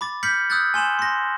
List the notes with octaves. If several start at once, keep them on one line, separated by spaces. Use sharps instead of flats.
B5 D6 A6
F6 G6 B6 C#7 F#7
D#6 E6 F#6 G6 A6
G#5 C6 E7 F#7
C6 A#6